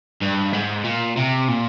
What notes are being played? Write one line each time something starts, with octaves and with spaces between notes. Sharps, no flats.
G2
G#2
A#2
C3
A#2